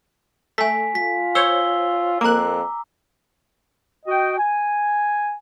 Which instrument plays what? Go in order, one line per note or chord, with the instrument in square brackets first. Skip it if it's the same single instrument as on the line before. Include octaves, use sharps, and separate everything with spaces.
[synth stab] A3 [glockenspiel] G#5 B6
[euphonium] F4 [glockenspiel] B6
[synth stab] C5 C#5 [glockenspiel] E6 G7
[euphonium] F2 [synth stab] A#3 F#6 [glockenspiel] A#5 D6
[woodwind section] F#4 D#5 G5
G#5